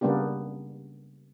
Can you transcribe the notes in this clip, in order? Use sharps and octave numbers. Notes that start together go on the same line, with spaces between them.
C#3 G3 A#3 B3 D4 G4